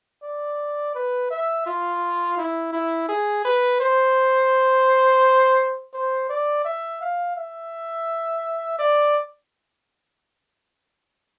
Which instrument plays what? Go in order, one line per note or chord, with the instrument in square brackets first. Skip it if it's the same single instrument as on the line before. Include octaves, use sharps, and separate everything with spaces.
[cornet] D5
B4
E5
F4
E4
E4
G#4
B4
C5
C5
D5
E5
F5
E5
D5